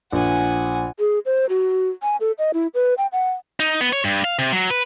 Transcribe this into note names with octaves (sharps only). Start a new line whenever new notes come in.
A#1 F#5 G#5
G#4
C5
F#4
G#5
A4
D#5
E4
B4
G5
F#5
D#4
B3
C#5
G2
F5
C3
F#3
B4